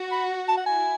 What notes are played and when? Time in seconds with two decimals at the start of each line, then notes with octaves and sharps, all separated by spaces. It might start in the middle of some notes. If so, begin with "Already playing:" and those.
Already playing: F#4
0.12 B5
0.48 A5
0.57 F#5
0.66 E4 G#5